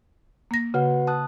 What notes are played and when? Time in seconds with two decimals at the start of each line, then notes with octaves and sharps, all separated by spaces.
0.51 A#3 A#6
0.74 C#3 F#4 B4 F#5
1.07 A5 D#6 F#6